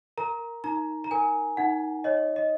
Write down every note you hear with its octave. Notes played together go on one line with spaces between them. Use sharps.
A#4 A#5
D#4 A#5
A#5
A#4 G#5
D#4 F#5
C#5 D#5
D#5